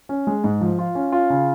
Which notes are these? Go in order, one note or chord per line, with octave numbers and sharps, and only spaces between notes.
C#4
G#3
G#2
F3
F4
C#4
F4
C#3